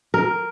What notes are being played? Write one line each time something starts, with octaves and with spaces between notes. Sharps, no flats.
A#4